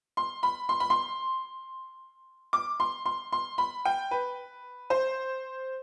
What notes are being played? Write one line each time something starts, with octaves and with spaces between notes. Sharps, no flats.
C6
B5
C6
B5
C6
D6
C6
C6
C6
B5
G5
B4
C5